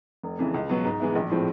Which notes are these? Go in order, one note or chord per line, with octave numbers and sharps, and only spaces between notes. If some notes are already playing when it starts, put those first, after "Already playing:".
F1
F2 C#3 E3
C#2
B2 F#3 B3
G#2
E3 G#3 B3 E4
A#1
A2 F3 G#3 C4